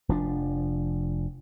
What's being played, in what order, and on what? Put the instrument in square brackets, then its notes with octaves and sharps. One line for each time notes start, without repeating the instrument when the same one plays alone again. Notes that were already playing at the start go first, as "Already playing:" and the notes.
[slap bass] F1 F3 D4